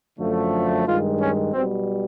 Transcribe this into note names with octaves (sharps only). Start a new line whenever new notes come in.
F#2 D3 F3 A3
G2 D#3 G#3 F4
C#4
B1 B2 G3 C4